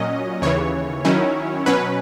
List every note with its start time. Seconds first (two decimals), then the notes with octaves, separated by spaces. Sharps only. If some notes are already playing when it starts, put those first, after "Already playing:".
Already playing: A#2 F#3 C#4 D#5
0.42 D#2 C#3 E3 C#5
1.05 D#3 F#3 C#4 E4
1.66 B2 F#3 C#4 B4